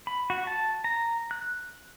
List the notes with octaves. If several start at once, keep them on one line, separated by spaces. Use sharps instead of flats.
B5
F#4
A5
A#5
F#6